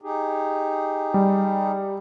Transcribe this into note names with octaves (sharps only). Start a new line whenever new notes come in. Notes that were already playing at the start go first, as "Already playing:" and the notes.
D#4 G4 G#4
G3